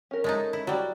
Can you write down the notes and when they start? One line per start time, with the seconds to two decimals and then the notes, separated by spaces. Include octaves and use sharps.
0.11 C#4 A#4
0.24 G#3 A3 D#4
0.53 E4
0.67 F#3 G3 F#4